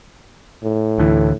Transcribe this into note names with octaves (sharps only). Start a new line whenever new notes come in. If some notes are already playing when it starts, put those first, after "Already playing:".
A2
D2 D3 E3